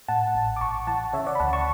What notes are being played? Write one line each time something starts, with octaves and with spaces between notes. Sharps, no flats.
A2 F#5 A5
A1
D6
A1 A5 C#6
E3 F#5 A5
C#3 C#5 E5
D5 F#5
B5
D2 F#5 A5
A5 C#6